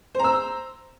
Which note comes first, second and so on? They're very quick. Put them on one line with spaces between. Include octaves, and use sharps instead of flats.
C5 A#5 E6